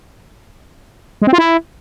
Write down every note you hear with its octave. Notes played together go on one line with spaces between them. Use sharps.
G#3
C4
F4
E4